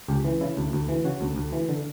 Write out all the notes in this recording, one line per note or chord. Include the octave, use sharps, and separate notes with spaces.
C#2 G4
E3
C#3 E4
D2
D2
E3
C#3 F#4
D2
D2
E3
D3